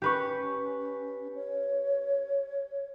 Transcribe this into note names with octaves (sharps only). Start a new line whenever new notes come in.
C#4 G4 B4 C#6
C#5